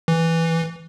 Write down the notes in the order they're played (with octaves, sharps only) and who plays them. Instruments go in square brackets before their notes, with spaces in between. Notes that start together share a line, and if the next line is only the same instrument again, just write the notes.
[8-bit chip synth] E3